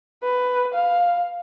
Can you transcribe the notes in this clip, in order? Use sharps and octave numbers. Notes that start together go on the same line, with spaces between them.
B4
F5